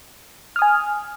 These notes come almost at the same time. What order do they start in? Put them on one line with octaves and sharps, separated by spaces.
F6 D#6 G#5